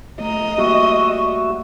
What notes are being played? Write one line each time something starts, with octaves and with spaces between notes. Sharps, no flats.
A3 D#5 A#5
G3 A#3 F#4 G4 E5 C#6